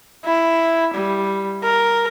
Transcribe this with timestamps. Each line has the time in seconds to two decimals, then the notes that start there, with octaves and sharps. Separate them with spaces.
0.25 E4
0.94 G3
1.64 A#4